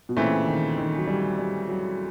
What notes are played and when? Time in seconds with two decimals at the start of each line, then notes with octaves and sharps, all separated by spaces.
0.09 B2
0.16 A#2 C#3 E3 A3 C4
0.47 D#3
0.78 D#3
0.98 F#3
1.07 G3
1.39 G3
1.68 F#3